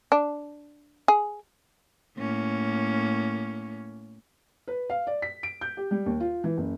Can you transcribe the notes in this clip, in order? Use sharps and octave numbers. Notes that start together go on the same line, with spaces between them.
D4
G#4
A2 A#3 C#4
B4
F5
D5
B6
D7
G6
G4
G3
D#2
F4
E3
F#1